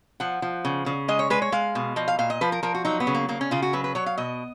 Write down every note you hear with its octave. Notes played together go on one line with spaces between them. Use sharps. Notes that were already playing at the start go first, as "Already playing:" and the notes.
F3 F#5
F3
C#3
C#3
G#3 D#5
C#5
G#3 B4
C#5
G#3 F5
B2
F3 D#5
F5
A#2 F5
D#5
F3 B4
A#4
F3 A#4
F#4
F#3 D#4
B3
C#3
A#3
C#3 A#3
C#4
C#3 F4
F#4
F#3 B4
B4
F#3 C#5
F5
B2 D#5